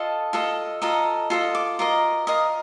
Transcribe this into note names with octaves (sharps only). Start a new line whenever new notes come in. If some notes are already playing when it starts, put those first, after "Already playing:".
Already playing: F4 A4 D#5 A5
F4 A4 D#5
F4 A4 D#5 A#5
F4 A4 D#5
D6
F4 A#4 D#5
F4 A#4 D#5 D#6